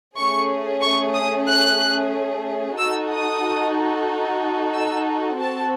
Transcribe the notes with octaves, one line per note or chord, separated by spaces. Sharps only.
A3 C#4 G#4 C#6
C#6
D#6
F#6
D#4 F#4 A4 E6
D#6
E6
C4 F#4 A4 A5